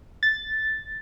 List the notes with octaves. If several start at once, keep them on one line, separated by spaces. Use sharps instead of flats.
A6